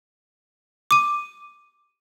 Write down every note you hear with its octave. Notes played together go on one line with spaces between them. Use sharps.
D6 D#7